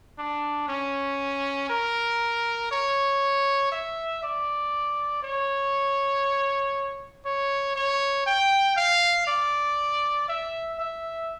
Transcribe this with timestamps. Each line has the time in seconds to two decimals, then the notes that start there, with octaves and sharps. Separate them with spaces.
0.19 D4
0.68 C#4
1.69 A#4
2.71 C#5
3.72 E5
4.23 D5
5.23 C#5
7.25 C#5
7.76 C#5
8.26 G5
8.77 F5
9.27 D5
10.28 E5
10.79 E5